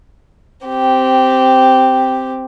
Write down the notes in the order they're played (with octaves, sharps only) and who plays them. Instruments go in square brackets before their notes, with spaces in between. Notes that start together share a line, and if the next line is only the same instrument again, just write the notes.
[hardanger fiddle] C4 G4